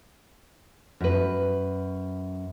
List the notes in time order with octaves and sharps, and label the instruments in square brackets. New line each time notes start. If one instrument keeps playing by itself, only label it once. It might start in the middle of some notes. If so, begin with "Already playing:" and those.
[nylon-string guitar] F#2 B4